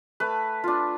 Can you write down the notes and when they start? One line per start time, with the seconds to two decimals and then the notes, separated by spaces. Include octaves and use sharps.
0.20 A3 B4
0.64 D4 F4